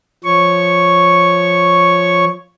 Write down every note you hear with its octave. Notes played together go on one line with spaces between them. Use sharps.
F3 C#5 C#6